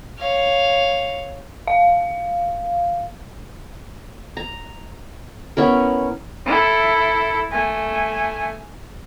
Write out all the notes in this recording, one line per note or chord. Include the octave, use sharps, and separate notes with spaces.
C#5 F5
F5
A#5
B3 C#4 E4 A#4
E4 A4
A3 G#5